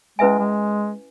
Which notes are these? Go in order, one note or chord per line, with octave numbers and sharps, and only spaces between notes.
G#3 C#4 E4 B4 E5 G#5
G#3